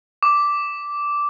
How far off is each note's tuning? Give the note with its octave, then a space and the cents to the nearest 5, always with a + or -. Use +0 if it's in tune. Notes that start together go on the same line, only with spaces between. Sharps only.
D6 -5